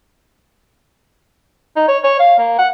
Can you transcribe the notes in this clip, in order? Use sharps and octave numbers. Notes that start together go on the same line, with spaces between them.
D#4
C#5
C#5
F5
A#3
F#5